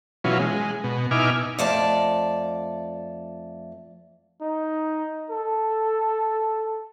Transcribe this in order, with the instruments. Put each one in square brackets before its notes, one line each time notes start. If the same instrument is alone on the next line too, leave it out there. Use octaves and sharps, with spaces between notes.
[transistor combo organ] B2 E3 F#3 C#4 F4
G#3
B2
B2 D#4 E4 G#5 D6 F6
[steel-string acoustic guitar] F2 A3 D5 A5
[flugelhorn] D#4
A4